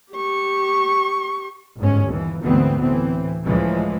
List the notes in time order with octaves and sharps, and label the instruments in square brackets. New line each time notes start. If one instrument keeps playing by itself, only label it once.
[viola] G4 C#6
[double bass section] G1 G#2 C#4
D#2 E3
D2 G#2 E3 B3 C4
A2 E3 C4
C#2 A2 C#3 E3 F3 G#3